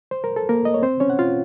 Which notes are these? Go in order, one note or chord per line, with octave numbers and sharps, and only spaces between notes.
C5
A#4
A4
A#3 A#4
D#5
C#5
C4 C5
C#4 C#5
F#5
F4 F5